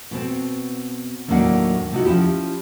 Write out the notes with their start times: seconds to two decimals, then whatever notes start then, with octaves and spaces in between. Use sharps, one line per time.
0.11 B2 B3 C4
1.28 D#2 A2 F#3 A#3 D4 F#5
1.91 A2 C3 D#4 F#4
2.05 F3 C#4 E4 G4